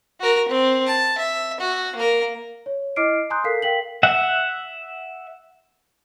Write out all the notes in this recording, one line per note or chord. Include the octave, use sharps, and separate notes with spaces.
F#4 A#4
C4
A5
E5
F#4
A#3 A#4
C#5
E4 D#5 D6 F6 C7 D7
G#5 A#5 C6 D#6 F#6 G6
A4 A#4 F5 B6 C7
A#4 F5 G5 B6 F#7
E5 F#5